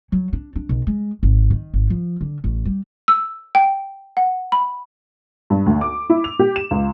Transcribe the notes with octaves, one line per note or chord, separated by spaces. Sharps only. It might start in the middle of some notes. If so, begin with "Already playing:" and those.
F#3
D4
D4
B1
G#3
G#1
D#3
G#1
F3
D3
A1
G3
E6
G5
F#5
B5
G2
D2
D6
E4
F7
G4
E7
C#2